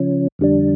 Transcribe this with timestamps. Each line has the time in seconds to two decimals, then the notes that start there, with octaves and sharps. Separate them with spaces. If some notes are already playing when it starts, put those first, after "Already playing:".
Already playing: C#3 F3 C#4
0.39 F2 D3 G3 D4